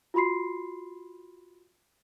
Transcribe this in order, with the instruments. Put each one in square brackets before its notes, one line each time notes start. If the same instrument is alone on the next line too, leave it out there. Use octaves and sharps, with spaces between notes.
[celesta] F4 F#4 B5 C6 C7